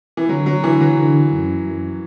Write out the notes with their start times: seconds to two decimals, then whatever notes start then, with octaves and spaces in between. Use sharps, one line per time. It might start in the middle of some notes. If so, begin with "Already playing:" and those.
0.17 E3
0.29 D3 F#3
0.46 F#3
0.64 D3 E3
0.81 F#3
0.98 D3
1.32 F#2
1.66 F#2